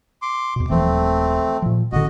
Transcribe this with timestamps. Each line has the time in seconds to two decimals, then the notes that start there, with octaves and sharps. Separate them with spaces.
0.22 C6 D6
0.56 E2 B2
0.70 D#1 E3 F3 A3 C4
1.62 A#2 F3
1.92 A1 D3 F#4 D#5